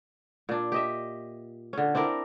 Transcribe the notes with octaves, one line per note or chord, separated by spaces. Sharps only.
A#2 D4
G4 D#5 E5
D3 C#4
C4 D4 E4 A#4